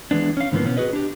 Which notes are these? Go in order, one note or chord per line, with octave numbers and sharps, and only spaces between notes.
E3 G#3 B3 D4
C#4 F5
G#2 D3 E3 F3 A#3 B3
B2 B3 C#4
F#4 G#4 B4 D#5
D4 G4